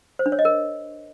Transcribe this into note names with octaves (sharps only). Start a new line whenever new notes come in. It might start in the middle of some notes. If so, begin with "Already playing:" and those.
C5
D4
C#5
D#5
A#4